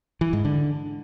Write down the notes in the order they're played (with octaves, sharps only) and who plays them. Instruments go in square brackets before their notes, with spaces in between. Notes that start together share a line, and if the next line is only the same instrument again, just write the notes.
[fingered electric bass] E3
G#2
D3